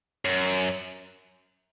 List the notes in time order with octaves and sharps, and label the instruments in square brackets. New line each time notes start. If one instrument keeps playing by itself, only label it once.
[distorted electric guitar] F#2